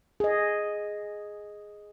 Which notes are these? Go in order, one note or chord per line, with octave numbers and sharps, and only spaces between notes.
G#4 D#5